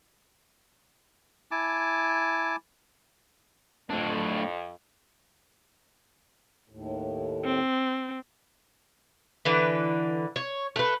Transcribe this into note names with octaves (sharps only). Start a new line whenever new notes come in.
E4 G#5 A5 D6
F2 A2 D4
D#2 A2
C4
D3 E3 B4
C#5
A3 B4